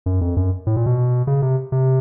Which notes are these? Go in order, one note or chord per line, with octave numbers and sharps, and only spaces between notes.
F#2
F2
F#2
A2
A#2
B2
C#3
C3
C3